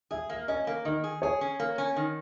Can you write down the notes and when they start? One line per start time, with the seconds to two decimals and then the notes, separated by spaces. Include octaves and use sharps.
0.11 G#4 E5
0.29 A#3 E5
0.48 C#4 D#5
0.67 A#3
0.85 D#3 D#5
1.04 G#4
1.22 G#4 C#5
1.41 C#4
1.60 A#3
1.78 C#4
1.96 D#3